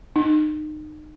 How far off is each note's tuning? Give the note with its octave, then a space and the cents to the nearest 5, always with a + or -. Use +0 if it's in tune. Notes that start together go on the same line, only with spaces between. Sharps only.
D#4 -30